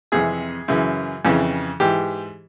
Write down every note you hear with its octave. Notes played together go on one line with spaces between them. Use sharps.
F2 C3 E3 G#4
F#2 C#3 E3
F2 C#3 E3
G#2 E3 G4